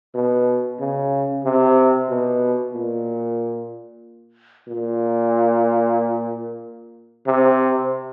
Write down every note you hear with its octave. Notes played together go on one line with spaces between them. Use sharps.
B2
C#3
C3
B2
A#2
A#2
C3